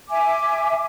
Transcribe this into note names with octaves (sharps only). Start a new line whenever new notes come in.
E5 G#5 D6